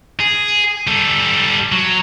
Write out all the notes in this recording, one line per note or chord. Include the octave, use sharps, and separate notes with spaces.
G#4
G3 A4
F#3